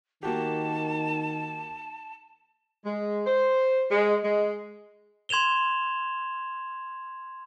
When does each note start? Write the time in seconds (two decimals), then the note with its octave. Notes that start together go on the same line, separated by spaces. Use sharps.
0.23 D#3 A#3 F#4 G4 A5
2.86 G#3
3.27 C5
3.91 G#3
4.24 G#3
5.29 C6 G#6 E7 F7 G7